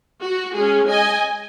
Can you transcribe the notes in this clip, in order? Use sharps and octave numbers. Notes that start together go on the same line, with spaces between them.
F#4
G#3 C#4 G#4
D#5 G#5